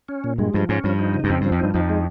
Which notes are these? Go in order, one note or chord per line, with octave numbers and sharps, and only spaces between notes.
C#4
A#2
G2 G#3
G2 F3
G#2 C#4
G2 F3
D#4
C#3
G2
F2 C4
G2
F3
F2
G2 D#4
F2 D#4
G#3